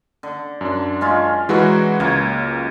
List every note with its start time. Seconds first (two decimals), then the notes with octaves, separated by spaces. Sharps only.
0.23 D3
0.61 F#2 D4
1.01 G#3 C#4 F4
1.49 E3 F#3 G#3 F#4 B4 D6
2.00 C#2 A#3 C#5